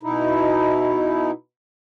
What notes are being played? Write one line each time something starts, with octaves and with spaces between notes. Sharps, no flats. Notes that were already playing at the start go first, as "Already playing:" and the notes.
B2 D#4 E4